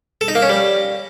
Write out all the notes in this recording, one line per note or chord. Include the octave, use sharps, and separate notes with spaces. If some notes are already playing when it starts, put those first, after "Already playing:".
A4
D#4
A#3
C#4
G3